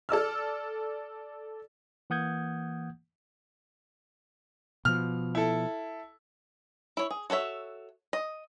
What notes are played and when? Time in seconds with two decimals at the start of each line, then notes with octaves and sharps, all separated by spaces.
0.09 A4 D5 E6 F6
2.10 E3 A#3 F#5 D#6 G6 G#6
4.85 B2 F3 F6
5.35 E4 A4
6.97 E4 C#5
7.11 G#4
7.30 F#4 A4 C#5 E5
8.13 D#5